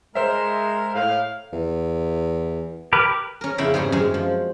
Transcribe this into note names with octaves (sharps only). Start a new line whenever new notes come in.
G#3 A#4 C5 E5
A2 F5
E2
G4 A#4 B4
C#4 A#4
F2 C#3 B3 E4 G5 B5
G#2 G3 G#4 C#5 C6
F#2 G#3
F3